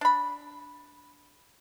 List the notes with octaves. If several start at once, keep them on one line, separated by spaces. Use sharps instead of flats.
D4 B5